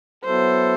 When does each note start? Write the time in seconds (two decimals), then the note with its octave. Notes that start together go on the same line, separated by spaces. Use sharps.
0.24 F#3 B3 E4 A4 C5